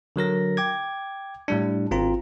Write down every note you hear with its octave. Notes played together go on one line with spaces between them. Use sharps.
D3 F#3 A#4 A#6
G5 D6 G#6
A2 G3 D4
G#1 C4 F4 A#5